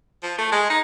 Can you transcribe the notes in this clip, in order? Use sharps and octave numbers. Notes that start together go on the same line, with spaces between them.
F3
A3
G#3
D#4